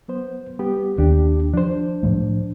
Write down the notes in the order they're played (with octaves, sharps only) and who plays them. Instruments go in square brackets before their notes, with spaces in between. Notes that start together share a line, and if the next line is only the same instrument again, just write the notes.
[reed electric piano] F#3 B3 C5
G3 B3 G4
[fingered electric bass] D#2 [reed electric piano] D4 G4
[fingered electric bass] F3 [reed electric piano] D4 C5
[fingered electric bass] A2 F3 A3